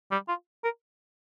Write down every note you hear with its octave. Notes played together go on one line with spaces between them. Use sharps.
G3
F4
A#4